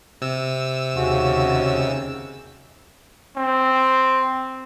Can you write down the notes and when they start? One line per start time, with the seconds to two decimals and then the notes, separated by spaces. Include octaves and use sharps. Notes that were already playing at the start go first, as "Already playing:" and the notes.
0.22 C3 E6
0.96 D#2 C#3 F#4
3.36 C4